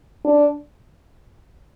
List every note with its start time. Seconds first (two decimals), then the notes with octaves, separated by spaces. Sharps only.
0.25 D4